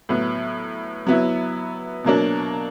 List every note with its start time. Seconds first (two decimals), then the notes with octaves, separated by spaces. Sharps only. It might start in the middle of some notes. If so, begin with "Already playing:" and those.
0.09 A2 F#3 B3
1.07 F#3 B3 E4
2.04 B2 F#3 A#3 D4